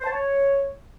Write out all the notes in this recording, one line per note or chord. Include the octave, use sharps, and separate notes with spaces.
C5
A5
C#5